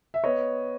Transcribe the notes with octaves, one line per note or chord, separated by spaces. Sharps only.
E5
B3 C#5 D#5